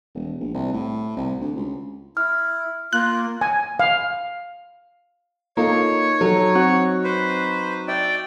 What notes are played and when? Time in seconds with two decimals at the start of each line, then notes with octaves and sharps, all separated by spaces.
0.15 E1
0.41 A#1
0.54 C2
0.74 A2
1.17 C2
1.41 D2
1.56 C#2
2.17 E4 F6
2.93 A#3 F4 F#6
3.41 G#5
3.80 F5
5.57 A#3 D#4 F4 A4 C#5
6.21 F#3 A4
6.55 C4 F#4
7.04 B4 C5
7.88 D5 E5 G5